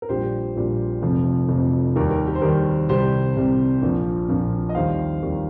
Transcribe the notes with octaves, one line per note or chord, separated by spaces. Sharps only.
A#4
A#1 A#2 G3 G4 C5
A#1 A#2 G3
F1 F2 F3
F1 F2 F3
D#2 D#3 G3 A#4
A#4
G4
C5
D#2 D#3 G3 A#4
C2 C3 G3 G4 C5
C2 C3 G3
A#1 A#2 F3
A#1 A#2 F3
D#5
D#2 D#3 G3 C5 F5
D#2 D#3 G3